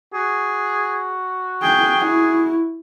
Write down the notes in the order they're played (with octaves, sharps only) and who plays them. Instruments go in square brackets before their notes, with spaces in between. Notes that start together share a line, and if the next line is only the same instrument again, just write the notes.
[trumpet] F#4 [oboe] G#4
[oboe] G#4 [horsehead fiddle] G5
[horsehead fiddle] E4